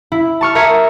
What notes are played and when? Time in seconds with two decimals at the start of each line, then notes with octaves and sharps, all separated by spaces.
0.12 E4
0.41 A5 C#6 F6
0.55 A#4 E5 D#6 G#6 C#7